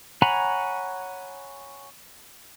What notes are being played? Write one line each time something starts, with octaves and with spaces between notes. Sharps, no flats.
C#5 F#5 G#5 A#5 B5